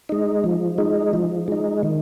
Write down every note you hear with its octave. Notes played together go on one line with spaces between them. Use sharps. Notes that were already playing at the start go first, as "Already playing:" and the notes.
G#3 D#4
F3
G#3 D#4
F3
G#3 D#4
D#3